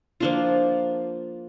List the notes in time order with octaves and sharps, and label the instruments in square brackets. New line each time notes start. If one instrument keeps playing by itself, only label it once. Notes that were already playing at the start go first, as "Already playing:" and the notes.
[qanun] F3 A#3 D4 F4